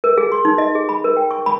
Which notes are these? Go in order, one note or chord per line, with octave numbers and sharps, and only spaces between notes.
A#4
G#4
C6
D#4
D#5
G#4
B5
A#4
G5
C#6
B5